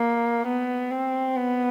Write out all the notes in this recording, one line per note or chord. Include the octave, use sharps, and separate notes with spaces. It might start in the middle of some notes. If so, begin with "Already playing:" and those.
Already playing: A#3
B3
C4
B3